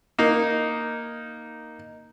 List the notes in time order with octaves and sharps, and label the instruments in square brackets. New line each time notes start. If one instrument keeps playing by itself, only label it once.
[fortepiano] A#3 D#4